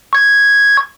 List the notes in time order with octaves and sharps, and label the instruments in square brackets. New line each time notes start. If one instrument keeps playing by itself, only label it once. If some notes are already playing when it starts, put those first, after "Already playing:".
[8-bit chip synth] C#6 G#6